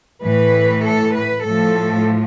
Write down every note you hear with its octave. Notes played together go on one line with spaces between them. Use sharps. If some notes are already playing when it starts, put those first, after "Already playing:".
A2 E3 B4
A4
B4
A2 F3 A4